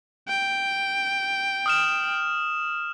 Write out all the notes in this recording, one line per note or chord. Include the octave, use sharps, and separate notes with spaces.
G5
D#6 F6 E7